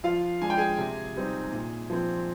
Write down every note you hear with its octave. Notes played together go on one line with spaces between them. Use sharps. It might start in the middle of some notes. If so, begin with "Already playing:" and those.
F3 F4 F5
G#3 D4 G#5
G5
G#4 G#5
C3
G3 C4 D#4
A#2
F3 C4